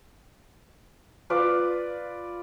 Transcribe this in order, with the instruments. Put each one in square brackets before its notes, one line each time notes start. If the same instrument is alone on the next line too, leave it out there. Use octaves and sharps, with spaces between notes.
[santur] F4 B4 D5